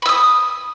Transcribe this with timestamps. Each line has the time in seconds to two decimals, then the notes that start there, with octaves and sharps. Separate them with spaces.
0.02 B5
0.06 E6
0.09 D#6